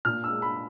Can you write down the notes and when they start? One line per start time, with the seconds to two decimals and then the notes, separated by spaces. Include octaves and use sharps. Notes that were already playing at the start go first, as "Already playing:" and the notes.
0.05 A#2 F6
0.24 E6
0.30 G#3
0.42 B5